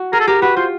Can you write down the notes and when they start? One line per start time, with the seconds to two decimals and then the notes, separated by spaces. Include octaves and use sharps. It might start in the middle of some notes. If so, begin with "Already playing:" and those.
Already playing: F#4
0.13 G#4 A#4
0.20 A4
0.27 G4 A#4
0.42 F#4 B4
0.56 F4 C5